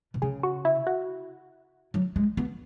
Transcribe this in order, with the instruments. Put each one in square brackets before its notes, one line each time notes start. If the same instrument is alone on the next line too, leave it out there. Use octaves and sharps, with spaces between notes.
[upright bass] B2
[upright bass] C#3 [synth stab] G#4
[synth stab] F#4
E4
F#4
[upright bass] F#3
G#3
B3